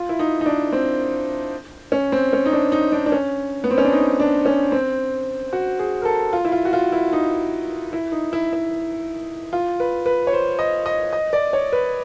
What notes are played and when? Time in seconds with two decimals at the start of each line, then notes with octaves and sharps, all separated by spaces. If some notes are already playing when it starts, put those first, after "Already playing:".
Already playing: F4
0.09 E4
0.19 D#4
0.41 D#4
0.46 D4
0.72 C4
1.92 C#4
2.12 C4
2.33 C#4
2.46 D#4
2.53 D4
2.72 D#4
2.92 D4
3.06 D4
3.12 C#4
3.64 B3
3.71 C4
3.78 C#4
3.85 D4
3.93 D#4
4.20 D4
4.46 C#4
4.72 C4
5.53 F#4
5.79 G#4
6.02 A#4
6.05 A4
6.33 F4
6.45 E4
6.52 F4
6.65 F#4
6.73 F4
6.92 E4
7.13 D#4
7.93 E4
8.12 D#4
8.33 E4
8.53 E4
9.53 F4
9.80 B4
10.06 B4
10.27 C#5
10.33 C5
10.59 D#5
10.86 D#5
11.13 D#5
11.33 D5
11.53 C#5
11.73 B4